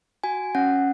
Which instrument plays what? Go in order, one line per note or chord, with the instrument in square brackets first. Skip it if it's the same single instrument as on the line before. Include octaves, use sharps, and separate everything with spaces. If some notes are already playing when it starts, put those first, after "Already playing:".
[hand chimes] F#4 G#5
C#4 F#5